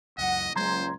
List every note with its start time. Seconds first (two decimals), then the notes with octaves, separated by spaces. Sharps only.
0.18 C#2 F#2 D#5 F#5
0.56 C#2 F#3 G#3 A#3 C5 A#5 C6 G#6